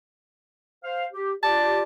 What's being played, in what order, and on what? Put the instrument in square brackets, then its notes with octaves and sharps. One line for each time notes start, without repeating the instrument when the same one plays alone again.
[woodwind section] C5 F5
G4
[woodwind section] F4 G4 D5 [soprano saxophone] A5